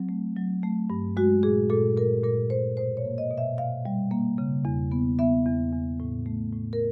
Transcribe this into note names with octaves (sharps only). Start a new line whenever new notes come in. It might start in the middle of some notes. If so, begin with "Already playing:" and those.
Already playing: F#3 C4
A3
F#3
A3
G2
G#3 F#4
A#2 G#4
A#2 A4
A#2 A#4
A#2 A#4
A#2 C5
B2 C5
C#5
A#3
D#5
B2
E5
B2 F5
G3
A#3
C#3
E2
B3
B3 E5
E2
E2
A2
A3
A2
A#4